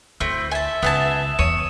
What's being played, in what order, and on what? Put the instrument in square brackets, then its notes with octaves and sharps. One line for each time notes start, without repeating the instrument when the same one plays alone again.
[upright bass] D2 [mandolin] A3 C4 E4 [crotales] E6
[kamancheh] E5 [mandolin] G#5 A5
[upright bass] C#2 [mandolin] B3 G#4 A5 [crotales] D#6 E7
[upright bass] E2 [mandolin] C#5 [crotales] D#7